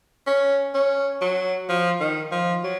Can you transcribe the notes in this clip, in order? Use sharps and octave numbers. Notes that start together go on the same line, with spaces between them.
C#4
C#4
F#3
F3
D#3
F3
F#3